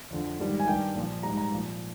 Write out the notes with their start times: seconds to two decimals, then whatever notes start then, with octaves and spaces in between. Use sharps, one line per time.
0.11 F2 D3 F3
0.39 G#2 D#3 G3
0.60 G#5
0.68 G2 D#3 G3 G5
0.96 A#2 F3
1.23 G#2 G3 A#5
1.37 A#5
1.52 A#2 F3